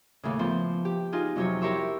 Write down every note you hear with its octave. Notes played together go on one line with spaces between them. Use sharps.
D#2 A2 C#3
F3 B3 C5
G4
D#4 F4 G#4 C5
F2 C3 F#3 C4 C#5
E4 G4 A#4 C#5 E5 C6